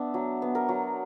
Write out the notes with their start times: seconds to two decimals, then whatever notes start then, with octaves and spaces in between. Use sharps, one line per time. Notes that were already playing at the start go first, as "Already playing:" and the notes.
Already playing: B3 D4 E5
0.14 F#3
0.42 B3
0.55 A#4
0.69 F#3